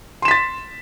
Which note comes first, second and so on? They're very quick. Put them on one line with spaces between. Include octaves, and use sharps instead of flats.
C6 E7 B6 A6